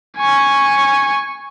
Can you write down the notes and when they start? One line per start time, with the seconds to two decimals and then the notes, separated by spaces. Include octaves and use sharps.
0.19 G#5 C#6